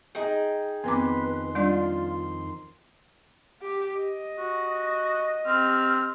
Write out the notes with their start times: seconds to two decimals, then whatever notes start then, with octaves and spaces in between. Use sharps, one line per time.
0.15 D#4 G#4 G5
0.84 F2 D#3 B3 C4 B4 C6 D6
1.55 G3 D4 F4 D5
3.62 G4
4.00 D#5
4.38 F#4
5.46 C4 G4 F6